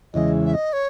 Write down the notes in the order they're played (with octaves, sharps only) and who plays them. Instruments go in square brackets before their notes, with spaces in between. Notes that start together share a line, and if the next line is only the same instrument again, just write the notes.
[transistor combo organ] E2 C#3 E3 G#3 [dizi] D#5
[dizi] E5
D#5
C#5